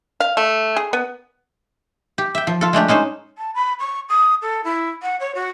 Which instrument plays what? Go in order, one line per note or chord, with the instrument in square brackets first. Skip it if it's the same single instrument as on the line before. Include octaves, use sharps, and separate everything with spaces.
[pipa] F5
A3
G#4
B3
[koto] G4
E5 G5
F3
F4 A4
G#3 A3 D4 G4
G#3 C#4 D#4 C5
[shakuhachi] A5
B5
C#6
D#6
A4
E4
F#5
C#5
F#4